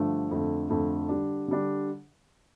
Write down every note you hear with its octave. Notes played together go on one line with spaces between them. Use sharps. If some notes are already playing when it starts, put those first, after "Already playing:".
Already playing: G2 D3 F3 A3
F2 D3 A3
F2 D3 A3
D3 G3 D4
D3 G3 D4